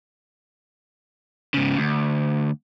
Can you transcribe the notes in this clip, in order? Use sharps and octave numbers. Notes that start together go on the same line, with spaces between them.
G#2 C#3
D2